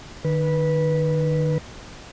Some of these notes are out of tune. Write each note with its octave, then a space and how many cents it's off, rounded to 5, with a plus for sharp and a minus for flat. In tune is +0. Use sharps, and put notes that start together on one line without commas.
D#3 -35 B4 -15